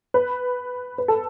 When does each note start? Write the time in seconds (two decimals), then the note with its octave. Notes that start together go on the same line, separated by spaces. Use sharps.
0.14 B4
0.98 B4
1.08 A4